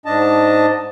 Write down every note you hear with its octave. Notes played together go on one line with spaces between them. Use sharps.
G#2 D4 D#5 A5